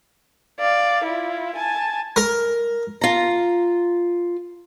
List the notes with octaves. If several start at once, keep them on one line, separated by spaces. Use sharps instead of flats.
D5 F5
E4 F4
G#5 A5
A#4
F4 A#5